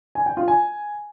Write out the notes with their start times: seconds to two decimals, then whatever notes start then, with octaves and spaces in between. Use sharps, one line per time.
0.15 G#5
0.26 G5
0.37 F4
0.48 G#5